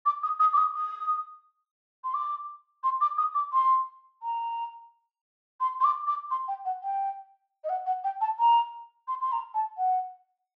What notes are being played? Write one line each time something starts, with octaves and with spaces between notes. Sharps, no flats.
D6
D#6
D#6
D6
D#6
D#6
C6
D6
C6
D6
D#6
D6
C6
A#5
C6
C6
D6
D6
C6
G5
F#5
G5
D#5
F#5
F#5
G5
A5
A#5
C6
C6
A#5
A5
F#5